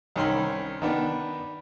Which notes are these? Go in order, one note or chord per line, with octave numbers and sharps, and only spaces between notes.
C2 D#3 C#4 B5 C6
D#3 B3 D4